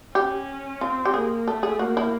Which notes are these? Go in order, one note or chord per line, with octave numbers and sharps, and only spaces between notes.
C#4 G4
C4 F4
G4
A#3 G#4
A3 A4
G#4
A#3 F#4
E4